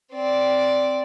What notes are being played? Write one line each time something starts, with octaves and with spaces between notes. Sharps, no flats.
C4 D5